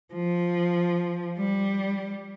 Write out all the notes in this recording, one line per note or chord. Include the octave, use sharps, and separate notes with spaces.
F3
G3